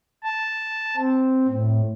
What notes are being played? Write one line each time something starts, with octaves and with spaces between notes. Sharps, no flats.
A5
C4
A2